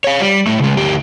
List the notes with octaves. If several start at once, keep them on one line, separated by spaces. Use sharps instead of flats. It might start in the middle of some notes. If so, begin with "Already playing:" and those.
C#5 F5
G3
A2 A3
C#3 G#3
D2 G4